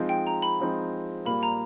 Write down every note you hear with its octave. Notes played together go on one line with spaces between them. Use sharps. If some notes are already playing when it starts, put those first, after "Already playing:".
Already playing: F3 G#3 C4 D#4
G5
A#5
B5
F3 G#3 C4 D#4
A#2 G3 A#3 B5
A#5